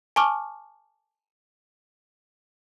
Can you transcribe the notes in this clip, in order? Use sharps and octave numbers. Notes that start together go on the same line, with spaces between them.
G#5 A5 C#6 D6 F6